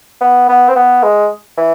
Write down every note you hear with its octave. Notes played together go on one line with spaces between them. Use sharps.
B3
B3
C4
B3
G#3
E3